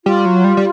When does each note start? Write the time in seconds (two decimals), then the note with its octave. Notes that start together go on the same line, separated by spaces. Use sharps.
0.05 G3 F4
0.26 F#3
0.44 G3
0.57 G3